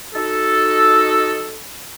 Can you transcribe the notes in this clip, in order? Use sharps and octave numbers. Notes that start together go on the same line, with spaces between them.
D#4 F#4 A4